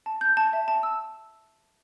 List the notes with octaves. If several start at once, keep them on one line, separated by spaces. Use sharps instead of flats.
A5
G6
A5
E5
A5
E6